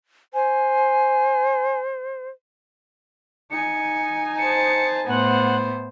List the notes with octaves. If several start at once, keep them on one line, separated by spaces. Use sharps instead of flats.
C5 G#5
D#4 G#5 C#7
C5 A5 C#7
A2 B3 C5 F#5